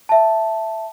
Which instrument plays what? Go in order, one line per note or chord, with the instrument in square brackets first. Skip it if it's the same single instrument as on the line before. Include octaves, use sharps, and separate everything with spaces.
[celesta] E5 A5